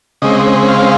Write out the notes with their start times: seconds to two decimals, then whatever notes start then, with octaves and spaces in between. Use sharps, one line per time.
0.22 C#3 G#3 C4 D#5
0.69 F5